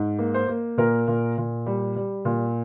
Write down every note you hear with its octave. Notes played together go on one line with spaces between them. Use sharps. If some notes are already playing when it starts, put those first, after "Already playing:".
Already playing: G#2
A#3
C5
A#3
A#2 A#4
A#2
A#2
G3
G3
A#2